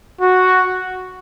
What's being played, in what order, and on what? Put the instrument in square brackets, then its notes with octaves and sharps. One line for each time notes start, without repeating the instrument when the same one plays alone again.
[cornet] F#4